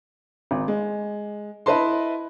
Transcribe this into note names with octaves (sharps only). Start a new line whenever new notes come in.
G#1
G#3
E4 B4 D#5 A5 C6